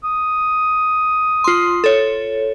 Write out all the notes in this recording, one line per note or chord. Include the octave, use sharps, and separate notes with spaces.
D#6
F4 C6
A4 C#5